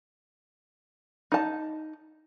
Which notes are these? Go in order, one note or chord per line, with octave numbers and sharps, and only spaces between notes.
D#4 A5